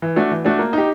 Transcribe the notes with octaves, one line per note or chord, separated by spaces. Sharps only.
E3
A3 D4 F#4
E3
A3 D4 F#4
A#3
D#4 G4